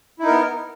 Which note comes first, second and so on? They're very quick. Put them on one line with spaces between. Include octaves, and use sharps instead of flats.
E4 D#4 A#4 B3